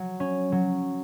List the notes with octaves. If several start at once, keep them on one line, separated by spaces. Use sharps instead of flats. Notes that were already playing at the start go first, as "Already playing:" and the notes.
Already playing: F#3
C#4
F#3